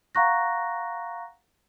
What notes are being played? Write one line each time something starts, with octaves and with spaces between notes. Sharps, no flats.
F5 F#5 A#5 C#6 F#6 A#6